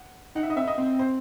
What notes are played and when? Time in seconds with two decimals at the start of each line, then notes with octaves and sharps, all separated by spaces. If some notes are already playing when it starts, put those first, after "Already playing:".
Already playing: F#5
0.35 D#4 F#5
0.43 E5
0.47 D#4 D#5
0.56 C4 E5
0.68 D#5
0.78 C4
0.99 C5